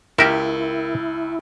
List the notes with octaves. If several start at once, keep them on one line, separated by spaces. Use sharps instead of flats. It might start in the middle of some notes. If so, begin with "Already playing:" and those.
C#2 E4 G4 A#4 E5